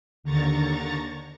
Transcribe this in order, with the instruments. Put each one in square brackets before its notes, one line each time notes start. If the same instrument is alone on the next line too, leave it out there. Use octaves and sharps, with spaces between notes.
[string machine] D#2 D3 A#5 C#6 A6